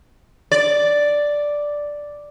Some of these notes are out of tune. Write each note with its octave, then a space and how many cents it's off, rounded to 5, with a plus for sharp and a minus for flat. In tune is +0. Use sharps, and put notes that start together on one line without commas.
D5 +0